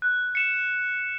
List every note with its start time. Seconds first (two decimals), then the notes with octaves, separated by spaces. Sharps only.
0.02 F#6
0.35 C#7 E7